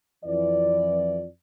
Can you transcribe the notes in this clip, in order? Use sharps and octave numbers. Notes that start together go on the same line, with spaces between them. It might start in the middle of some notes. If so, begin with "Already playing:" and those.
F2 E3 D5